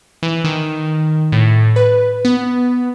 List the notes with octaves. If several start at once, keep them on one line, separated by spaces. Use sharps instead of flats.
E3
D#3
A2
B4
B3